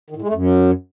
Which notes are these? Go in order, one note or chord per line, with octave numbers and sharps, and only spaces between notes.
D#3
A2
G#3
A3
F#2